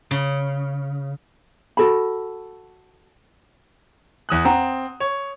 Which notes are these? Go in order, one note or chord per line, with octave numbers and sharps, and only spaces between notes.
C#3
F#4 A4 B5
E2 D#6 F#6
C4 F#5 A#5
C#5